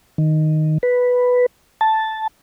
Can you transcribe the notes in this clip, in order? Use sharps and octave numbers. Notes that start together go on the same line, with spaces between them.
D#3
B4
A5